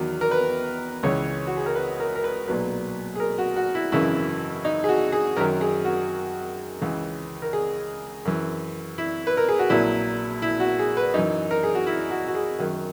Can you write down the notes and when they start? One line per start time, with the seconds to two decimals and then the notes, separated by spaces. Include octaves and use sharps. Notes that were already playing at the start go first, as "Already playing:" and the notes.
Already playing: E2 D#3 F#3
0.21 A#4
0.31 B4
1.03 C#2 C#3 E3 C#5
1.47 F#4
1.57 G#4
1.66 A#4
1.75 B4
2.00 A#4
2.16 A#4
2.24 B4
2.48 B1 A#2 F#3 B4
3.16 G#4
3.20 A#4
3.38 F#4
3.56 F#4
3.75 E4
3.92 G#1 F#2 C#3 E3 E4
4.65 D#4
4.84 G#4
4.89 F#4
5.12 G#4
5.37 F#2 D#3 F#3 A#4
5.61 G#4
5.85 F#4
6.81 C#2 C#3 E3
7.42 A#4
7.53 G#4
8.25 F#2 E3
8.98 E4
9.27 B4
9.37 A#4
9.49 G#4
9.59 F#4
9.70 A#1 A#2 F#3 E4
10.42 E4
10.60 F#4
10.79 G#4
10.97 B4
11.14 F#2 E3 D#4
11.51 A#4
11.63 G#4
11.75 F#4
11.87 E4
12.11 F#4
12.28 F#4
12.35 G#4
12.59 F#2 D#3 F#3